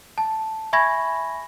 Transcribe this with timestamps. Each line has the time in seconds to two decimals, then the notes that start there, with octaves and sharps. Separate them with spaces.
0.18 A5
0.73 E5 G#5 B5 C#6 G#6 A#6